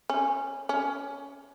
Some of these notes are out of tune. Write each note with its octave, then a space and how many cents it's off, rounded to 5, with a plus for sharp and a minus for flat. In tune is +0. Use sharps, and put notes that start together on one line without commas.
C#4 -10
C#4 +15